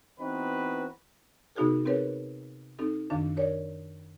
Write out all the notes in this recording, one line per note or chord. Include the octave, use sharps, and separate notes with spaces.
E3 B3 C4 D#4 F#4 B4
C3 B3 D#4 F#4 G#4 A#4
C4 G4 G#4 A#4 B4 C#5
C4 D#4 G4 A4
F#2 D#3 D4 F5
G4 A#4 C#5 D5